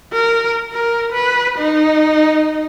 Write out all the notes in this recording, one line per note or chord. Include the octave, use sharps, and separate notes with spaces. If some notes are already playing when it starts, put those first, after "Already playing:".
A#4
A#4
B4
D#4